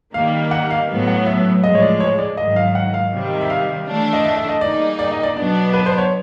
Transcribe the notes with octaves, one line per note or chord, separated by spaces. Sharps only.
D#3 G3 A#3 F5
F#5
F5
A2 F#3 B3
F#5
E5
A2 F3 G#3 D#5
C#5
D5
C#5
D5
G#2 D#3 F#3 D#5
F5
F#5
F5
C3 D#3 G3
E5
F5
E3 A3 D4
D#5
E5
E5
D#5
G3 A#3 D#4 G#4 D5
D5
D#5
D5
B2 F#3 B3 D4 D5
B4
C5
C#5